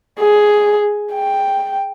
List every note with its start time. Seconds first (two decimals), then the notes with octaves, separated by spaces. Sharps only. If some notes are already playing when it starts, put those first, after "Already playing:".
0.19 G#4
1.13 G5